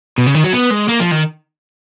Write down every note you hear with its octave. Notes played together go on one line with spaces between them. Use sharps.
B2
C#3
D#3
F#3
B3
G#3
A#3
F3
D#3